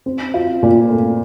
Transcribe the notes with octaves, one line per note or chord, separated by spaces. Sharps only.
C4
F4
A#2
A3